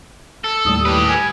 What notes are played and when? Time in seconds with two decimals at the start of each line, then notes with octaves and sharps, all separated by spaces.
0.44 A4
0.65 D#2 A2 G3 D#6
0.85 G4 B4
1.08 G#5